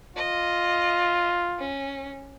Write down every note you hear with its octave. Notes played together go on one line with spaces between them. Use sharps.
F4 D#5
C#4